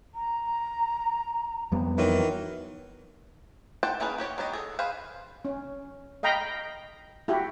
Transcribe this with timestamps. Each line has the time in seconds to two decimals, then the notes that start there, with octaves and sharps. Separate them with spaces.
0.15 A#5
1.72 F2 G3 B3
1.97 D#3 E3 F#3
3.83 C5 F#5 G5 A5
4.00 A3 A#3 C#4 G#4 B4
4.18 F#4 G4 C#5
4.38 F#3 B3 G4 D#5
4.53 G#4 A4
4.79 G#4 B4 C5 F5
5.45 C#4
6.23 D#5 F5 G5 A#5 B5
7.28 E4 F#4 G4